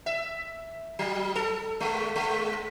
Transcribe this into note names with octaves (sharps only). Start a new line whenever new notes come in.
E5
F#3
A4
G#3
G#3